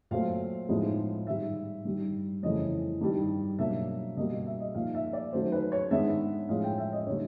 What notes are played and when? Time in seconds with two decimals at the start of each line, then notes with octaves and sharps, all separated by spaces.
0.11 A#2 F#3 A3 C4 F5
0.69 A2 F3 G#3 B3 D#4
1.27 G#2 D#3 G3 E5
1.85 G2 D#3 G3
2.43 F2 C#3 E3 A3 C#4 D#5
3.01 G2 D#3 G3
3.59 B2 F#3 A#3 D4 E5
4.17 B2 G3 A#3 D#5
4.32 D#5
4.46 E5
4.60 D#5
4.75 A#2 F3 A#3 D#4 F5
4.95 E5
5.13 D5
5.33 D#3 F#3 A3 C#4 C5
5.52 B4
5.72 C#5
5.91 G#2 D#3 G#3 B3 D4 E5
6.49 A2 F3 G#3 C#4 F5
6.63 G5
6.78 E5
6.93 D#5
7.07 D3 G3 A#3 D#4 C#5